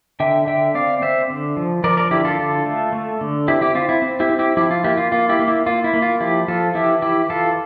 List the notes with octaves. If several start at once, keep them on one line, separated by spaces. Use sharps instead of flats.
D3 E5 G5
D3 E5 G5
C4 D5 F5
C4 C5 E5
D3
F3
F3 A#4 D5
A#4 D5
D3 E4 G4
F4 A4
D3
A3
A3
D3
C4 E4 G4
E4 G4
C4 F4
E4
C4
E4 G4
C4
E4 G4
F3 E4 G4
F4
A#3 E4 G4
F4
A#3 F4
E4 G4
A#3
E4
A#3 F4
E4
A#3
F4
F3 E4 G4
F3 F4 A4
E3 E4 G4
E3 E4 G4
E3 F4 A4